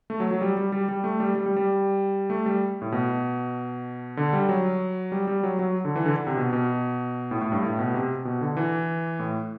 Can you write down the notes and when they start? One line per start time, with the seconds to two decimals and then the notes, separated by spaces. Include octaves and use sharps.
0.10 A3
0.20 F#3
0.31 F#3
0.41 G3
0.57 G3
0.72 G3
0.89 G3
1.04 A3
1.20 G3
1.35 G3
1.46 G3
1.56 G3
2.30 A3
2.46 G3
2.82 A2
2.92 B2
4.17 D3
4.33 G3
4.49 F#3
5.12 G3
5.27 G3
5.43 F#3
5.59 F#3
5.85 D3
5.96 E3
6.06 D3
6.16 D3
6.27 C3
6.37 B2
6.53 B2
7.31 A2
7.41 A2
7.52 G2
7.63 A2
7.79 B2
7.94 C3
8.25 B2
8.41 D3
8.57 E3
9.19 A2